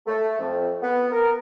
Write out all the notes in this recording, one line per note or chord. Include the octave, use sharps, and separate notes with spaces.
A3
F2
B3
A#4